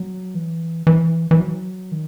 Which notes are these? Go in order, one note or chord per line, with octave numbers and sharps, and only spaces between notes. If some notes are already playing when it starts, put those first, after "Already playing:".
Already playing: F#3
E3
E3
E3
F#3
D#3